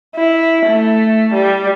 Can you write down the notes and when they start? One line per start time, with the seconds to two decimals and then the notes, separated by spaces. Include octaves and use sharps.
0.16 E4
0.66 A3
1.33 G3